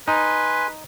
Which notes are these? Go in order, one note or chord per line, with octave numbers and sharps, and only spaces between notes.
D#4 B4 G#5 C6